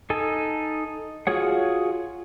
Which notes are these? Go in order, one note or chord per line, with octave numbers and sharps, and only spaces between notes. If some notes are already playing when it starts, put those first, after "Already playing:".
D#4 A4 G#5
F4 F#4 G#4 C#5 F#5